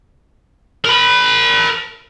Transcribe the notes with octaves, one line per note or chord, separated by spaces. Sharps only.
A#4 B5